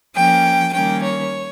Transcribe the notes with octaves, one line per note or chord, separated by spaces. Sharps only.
F3 A#3 C#4 G5
D#3 G3 A#3 C#4 G5
C#5